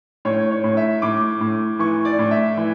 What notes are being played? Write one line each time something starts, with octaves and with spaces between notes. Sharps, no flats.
A2 C#5
C#5
A2
E5
A2 D6
A2
E3 C#6
D5
A2
E5
E3